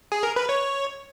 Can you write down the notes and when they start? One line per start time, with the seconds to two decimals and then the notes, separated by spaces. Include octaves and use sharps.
0.12 G#4
0.23 A#4
0.36 B4
0.49 C#5